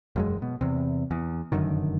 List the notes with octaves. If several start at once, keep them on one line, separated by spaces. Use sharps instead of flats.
E1 F#2 G#3
B2
E2 C3
E2
F1 F#2 D3 D#3